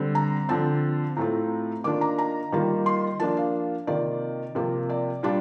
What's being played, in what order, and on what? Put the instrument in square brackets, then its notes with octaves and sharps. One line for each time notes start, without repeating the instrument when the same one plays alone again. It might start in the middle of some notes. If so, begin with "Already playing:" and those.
Already playing: [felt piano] D3 G3 C4
A#5
D3 F3 C4 A5
A2 A3 C4 F4 A#5
D#3 A#3 D4 F4 D6
A#5
A#5
D#3 G3 A#3 F4
C6
F3 A#3 D4 F4 A5
F5
C3 D#3 A#3 F4 D5
C3 F3 A#3 F4
D5
A#2 G3 D4 F4